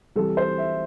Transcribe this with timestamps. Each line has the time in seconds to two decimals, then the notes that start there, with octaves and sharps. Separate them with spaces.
0.16 C2 C3 E3 G3 A4
0.37 C5
0.58 E5